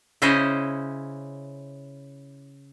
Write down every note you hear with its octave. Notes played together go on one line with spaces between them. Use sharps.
C#3 C#4 E4 C5 D#5